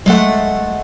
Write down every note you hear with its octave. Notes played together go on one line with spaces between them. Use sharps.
G#3 A3 F#5